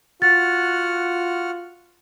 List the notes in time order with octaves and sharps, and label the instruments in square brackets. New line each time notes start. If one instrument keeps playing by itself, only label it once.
[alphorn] F4 [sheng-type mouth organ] F#4 F#5 F6 [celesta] A6